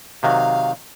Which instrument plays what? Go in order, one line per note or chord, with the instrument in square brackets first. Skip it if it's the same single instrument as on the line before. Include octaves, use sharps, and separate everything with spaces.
[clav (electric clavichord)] C3 D#3 F#3 [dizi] F5